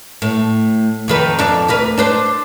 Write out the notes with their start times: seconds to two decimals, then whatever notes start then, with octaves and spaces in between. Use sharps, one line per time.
0.22 A2
1.08 F2 D#3 B4
1.39 F2 D4
1.68 D2 A#4 B4
1.98 D4 B4 C5